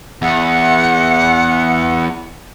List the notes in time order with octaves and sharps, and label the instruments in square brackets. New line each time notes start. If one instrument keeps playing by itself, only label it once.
[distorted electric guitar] E2 [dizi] F#5